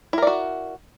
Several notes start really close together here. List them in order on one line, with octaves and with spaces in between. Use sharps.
E4 A#4 D5 F#4